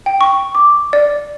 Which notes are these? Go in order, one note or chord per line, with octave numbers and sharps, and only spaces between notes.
G5
C#6
D6
D5